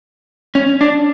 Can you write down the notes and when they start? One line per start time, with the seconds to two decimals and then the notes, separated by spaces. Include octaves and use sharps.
0.55 C#4
0.81 D4